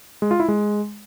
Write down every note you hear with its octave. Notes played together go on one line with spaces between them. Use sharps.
G#3
F4
E4
G#3